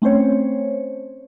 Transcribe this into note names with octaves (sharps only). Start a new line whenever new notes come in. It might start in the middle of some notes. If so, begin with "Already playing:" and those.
A3 C4 C#4 C5 C#5